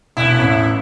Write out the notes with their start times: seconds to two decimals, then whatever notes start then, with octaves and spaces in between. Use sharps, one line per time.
0.17 E1 A2 E4 F#6
0.38 A1